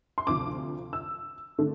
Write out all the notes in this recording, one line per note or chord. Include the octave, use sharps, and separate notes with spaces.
C6
D2 C3 F3 D6
E6
D3 A3